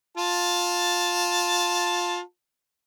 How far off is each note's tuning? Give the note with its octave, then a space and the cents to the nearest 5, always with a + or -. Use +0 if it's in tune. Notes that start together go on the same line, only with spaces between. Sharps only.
F4 +15 A5 +0